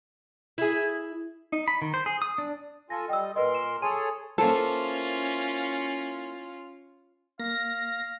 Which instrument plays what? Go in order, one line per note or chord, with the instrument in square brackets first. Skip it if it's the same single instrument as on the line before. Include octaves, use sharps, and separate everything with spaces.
[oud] E4 G#4
[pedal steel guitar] D#4
B5
D#3
C5
G#4
D#6
D4
[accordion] F4 A4 G#5 [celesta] A#6
[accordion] G3 D#5 [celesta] G5 E6
[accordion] A#2 A#4 C6 [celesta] B4 D#5
[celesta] E7
[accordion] G#4 A4 C#5 [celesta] G#5 C6 D#7
[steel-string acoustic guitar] A#3 E4 C5 [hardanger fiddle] C#4 F4 [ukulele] A4
[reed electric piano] A#3 [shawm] F5 [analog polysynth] A#6